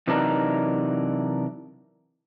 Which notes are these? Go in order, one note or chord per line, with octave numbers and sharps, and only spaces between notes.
C3 E3 F#3 D4 D#4 A#4